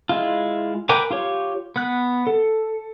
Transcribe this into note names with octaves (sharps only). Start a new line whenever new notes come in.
G#3 E4 F4
A#4 B4 G5 G#5 D6
F4 G4 C#5
B3 F#6
A4